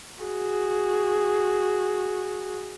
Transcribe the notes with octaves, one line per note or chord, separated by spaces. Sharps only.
F#4 G#4